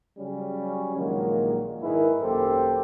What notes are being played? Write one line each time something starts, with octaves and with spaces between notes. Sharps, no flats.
C#3 F#3 G3 C#4
A#1 A#2 D#3 F#3 G#3 A#3
G#2 D#3 E4 G#4 A#4 B4
G#1 F#2 A#3 G4 A4 C5